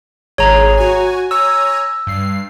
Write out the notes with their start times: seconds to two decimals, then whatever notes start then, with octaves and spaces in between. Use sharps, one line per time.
0.38 G#1 G#4 C#5 A#5
0.77 F#4 G#5
1.31 C#5 G#5 A#5 E6
2.07 G2 C7